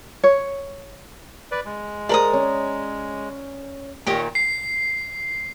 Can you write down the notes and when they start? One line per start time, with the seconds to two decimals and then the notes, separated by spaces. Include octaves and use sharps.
0.24 C#5
1.52 B4 D5
1.65 G#3
2.09 G#4 A#4 C5 D5 A#5 D#6
2.33 C#4
4.07 A#2 D#3 G4 C#5 D#5 D7
4.35 C7